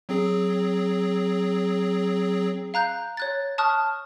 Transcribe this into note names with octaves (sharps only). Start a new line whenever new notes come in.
F#3 C4 G#4
F5 A#5 F#6 G6
C#5 F#6 A6
A5 C#6 D#6 F6 F#6